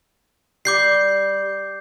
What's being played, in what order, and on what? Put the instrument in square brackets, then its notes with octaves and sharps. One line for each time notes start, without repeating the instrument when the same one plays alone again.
[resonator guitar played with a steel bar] G3 [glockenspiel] D6 G6 C7